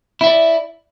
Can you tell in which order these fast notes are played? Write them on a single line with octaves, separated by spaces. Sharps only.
E4 E5 D5